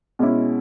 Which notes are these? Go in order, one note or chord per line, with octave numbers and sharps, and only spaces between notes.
B2 G#3 C#4 E4